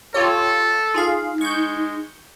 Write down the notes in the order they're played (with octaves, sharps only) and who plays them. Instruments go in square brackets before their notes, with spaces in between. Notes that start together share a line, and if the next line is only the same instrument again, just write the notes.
[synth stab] F4 G4 C#5 [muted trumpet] A4
[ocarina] D#4 [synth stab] F4 G#4 F5
[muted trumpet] G#3 [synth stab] C#6 G6